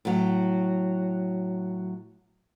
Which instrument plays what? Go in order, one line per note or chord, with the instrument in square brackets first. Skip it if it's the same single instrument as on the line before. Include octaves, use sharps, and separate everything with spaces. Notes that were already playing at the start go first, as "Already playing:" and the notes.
[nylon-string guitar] A2 F#3